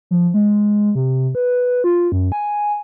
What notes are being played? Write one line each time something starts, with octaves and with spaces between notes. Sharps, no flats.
F3
G#3
C3
B4
F4
F#2
G#5